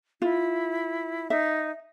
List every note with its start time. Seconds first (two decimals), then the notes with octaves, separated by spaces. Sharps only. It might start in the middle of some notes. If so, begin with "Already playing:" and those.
0.22 E4 F4
1.30 D#4 E5